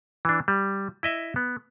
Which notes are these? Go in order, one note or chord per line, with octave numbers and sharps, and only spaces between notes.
E3 D4
G3
E4 D#5 E5
B3